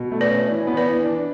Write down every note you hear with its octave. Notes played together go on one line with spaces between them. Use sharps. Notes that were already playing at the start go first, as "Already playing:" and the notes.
Already playing: B2
A3
B4 D5
C#4
E3
B3
B4 D5
E3
D4